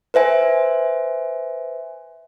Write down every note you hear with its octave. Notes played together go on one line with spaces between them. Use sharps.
B4 C5 E5 G#5